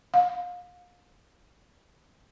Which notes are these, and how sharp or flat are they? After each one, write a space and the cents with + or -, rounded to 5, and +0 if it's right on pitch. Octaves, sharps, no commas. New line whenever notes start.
F5 +35